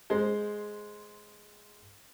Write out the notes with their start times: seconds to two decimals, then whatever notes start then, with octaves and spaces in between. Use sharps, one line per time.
0.10 G#3 C5